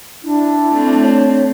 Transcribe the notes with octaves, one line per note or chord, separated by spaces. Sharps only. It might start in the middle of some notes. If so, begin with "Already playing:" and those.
D4 E4
A3 C4
C#5